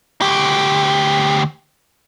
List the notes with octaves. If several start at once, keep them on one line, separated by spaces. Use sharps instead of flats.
D2 G4